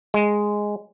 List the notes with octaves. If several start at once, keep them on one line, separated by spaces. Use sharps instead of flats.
G#3